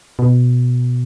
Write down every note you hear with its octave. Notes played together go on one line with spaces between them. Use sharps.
B2